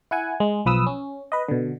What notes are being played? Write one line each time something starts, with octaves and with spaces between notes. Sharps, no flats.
E4 F#5 G#5
G#3
B1 F3 B4 D#6 E6
C#4
B4 D#5
B2 D3